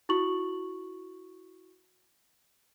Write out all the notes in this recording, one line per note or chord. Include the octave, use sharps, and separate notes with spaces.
E4 F#4 C#6 F#7